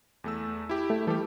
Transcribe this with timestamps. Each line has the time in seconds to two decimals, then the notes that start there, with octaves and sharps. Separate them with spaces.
0.24 E2 A3 E6
0.69 E4 G4
0.90 A3
1.07 E3 G3 A3 G4 A4